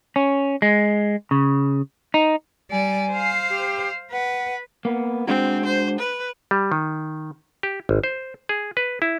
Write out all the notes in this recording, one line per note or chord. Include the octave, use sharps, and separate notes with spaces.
C#4
G#3
C#3
D#4
G3 D5 G#5
C5 F5
G4
B4 F#5
A#3 B3
G#3 C4 D4 F#4
C5
B4
G3
D#3
G4
G#1
C5
G#4
B4
E4